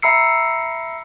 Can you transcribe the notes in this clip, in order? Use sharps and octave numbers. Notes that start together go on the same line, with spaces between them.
E5 A#5 B5 E6 C7 C#7